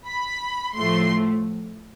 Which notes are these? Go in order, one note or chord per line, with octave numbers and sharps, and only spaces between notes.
B5
A2 F3 A3 C6